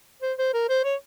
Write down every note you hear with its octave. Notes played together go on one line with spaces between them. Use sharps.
C5
C5
A#4
C5
C#5